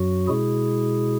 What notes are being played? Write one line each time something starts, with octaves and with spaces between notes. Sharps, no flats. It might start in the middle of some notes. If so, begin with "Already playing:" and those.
Already playing: F#2 F#3 F#4
B2 G#3 E4 G#4